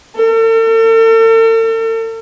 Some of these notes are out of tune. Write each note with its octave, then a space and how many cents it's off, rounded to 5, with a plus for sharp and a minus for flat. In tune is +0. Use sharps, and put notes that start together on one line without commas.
A4 +45